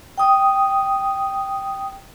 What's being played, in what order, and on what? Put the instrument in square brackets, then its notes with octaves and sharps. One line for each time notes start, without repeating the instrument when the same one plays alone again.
[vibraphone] G5 D#6